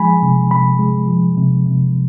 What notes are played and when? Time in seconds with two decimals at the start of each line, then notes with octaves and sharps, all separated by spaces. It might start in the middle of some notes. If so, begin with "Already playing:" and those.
Already playing: F3 G#3 G#5 B5
0.22 C3
0.51 C3 B5
0.79 G#3
1.08 F3
1.37 C3
1.66 C3